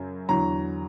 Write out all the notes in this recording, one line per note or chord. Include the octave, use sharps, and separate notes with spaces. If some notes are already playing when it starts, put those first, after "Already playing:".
Already playing: F#2 C#3 F#3
E2 D3 F#3 A#5